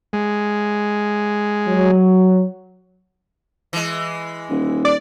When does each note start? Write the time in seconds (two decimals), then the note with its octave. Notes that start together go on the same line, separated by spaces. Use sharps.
0.13 G#3
1.68 F#3
3.73 E3 G#3
4.50 D#1
4.85 D5